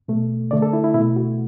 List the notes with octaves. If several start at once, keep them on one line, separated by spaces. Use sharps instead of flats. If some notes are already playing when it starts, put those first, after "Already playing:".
B2 A3
D3 A3 D5
A4
E4
E4
B2 A3 E4
F#4